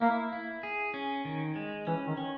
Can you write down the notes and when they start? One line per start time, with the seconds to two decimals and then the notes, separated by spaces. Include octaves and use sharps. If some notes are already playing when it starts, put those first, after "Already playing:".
0.01 A#3 E4
0.33 E4
0.63 G#4
0.94 C#4
1.25 D#3
1.56 G#3
1.87 E3 C#4
2.07 D#3
2.17 C#4